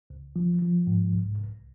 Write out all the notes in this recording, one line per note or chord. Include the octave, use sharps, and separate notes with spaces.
C#2
F3
F3
G#2
C2
C2